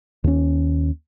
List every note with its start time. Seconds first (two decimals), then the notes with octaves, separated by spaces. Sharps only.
0.24 D#2 C#4